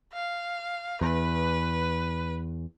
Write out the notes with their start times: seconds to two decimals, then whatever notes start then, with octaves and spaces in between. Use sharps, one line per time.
0.13 F5
1.01 E2 B4